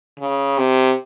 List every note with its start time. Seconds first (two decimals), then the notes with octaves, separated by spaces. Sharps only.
0.19 C#3
0.58 C3